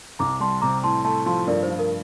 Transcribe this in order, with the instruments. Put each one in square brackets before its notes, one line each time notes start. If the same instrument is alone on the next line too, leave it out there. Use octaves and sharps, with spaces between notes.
[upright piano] C2 [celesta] A#5 D6
[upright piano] G3 [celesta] A5 C6
[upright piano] C3 [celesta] A#5 D6
[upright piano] A2 [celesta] A5 C6
[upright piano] A3 [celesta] A5 C6
[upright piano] F3 [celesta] A5 C6
[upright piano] G2 [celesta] A#4 D5
[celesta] C5
[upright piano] F3
[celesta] A#4